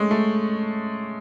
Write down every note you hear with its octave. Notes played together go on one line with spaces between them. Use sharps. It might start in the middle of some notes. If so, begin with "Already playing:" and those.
Already playing: G#3 A3 C#4
A3